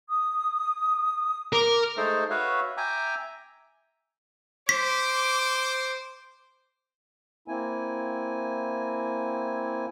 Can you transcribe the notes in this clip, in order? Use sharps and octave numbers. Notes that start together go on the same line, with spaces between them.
D#6
A#4 D6
G#3 A3 D#4 A4 C5
F#4 B4 C#5 E5 F5
E5 G5 G#5 A#5 D6
C5 D6 B6
A#3 C4 E4 G#5